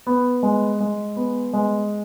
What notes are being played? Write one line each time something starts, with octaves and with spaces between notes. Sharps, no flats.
B3
G#3
G#3
B3
G#3